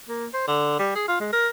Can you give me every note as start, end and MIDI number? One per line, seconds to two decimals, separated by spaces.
0.09 0.26 58
0.34 0.43 72
0.47 0.75 50
0.79 0.92 55
0.96 1.05 68
1.08 1.16 65
1.20 1.29 56
1.33 1.48 70